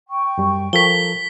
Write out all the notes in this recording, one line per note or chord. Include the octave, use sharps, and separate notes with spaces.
G5 C#6
F#2 G3
F3 A4 A#4 B6 G7